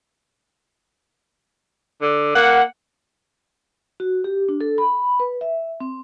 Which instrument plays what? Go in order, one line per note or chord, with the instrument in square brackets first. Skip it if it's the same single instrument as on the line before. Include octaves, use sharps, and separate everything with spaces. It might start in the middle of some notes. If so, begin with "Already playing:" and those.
[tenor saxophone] D3
[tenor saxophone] A#3 [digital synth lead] F#5
[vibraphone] F#4
G4
D4
A4
B5
B4
E5
C4